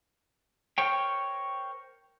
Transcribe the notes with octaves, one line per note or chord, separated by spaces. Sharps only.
A#4 C5 C#5 G5